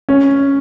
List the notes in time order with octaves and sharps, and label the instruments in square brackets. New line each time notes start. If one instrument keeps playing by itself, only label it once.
[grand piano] C#4